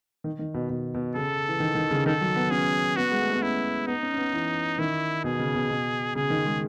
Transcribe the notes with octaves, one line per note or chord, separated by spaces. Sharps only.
D#3
D#3
B2
B2
B2
C#3 A4
E3
D#3
D#3
C#3
D#3 A4
F#3
B3
C#4 G#4
B3 F#4
G#3
A3
B3
C#4 E4
B3 D#4
C#4
C#4
B3
E3
D#3 E4
B2 G#4
C#3
B2
B2
C#3 G#4
D#3
G#3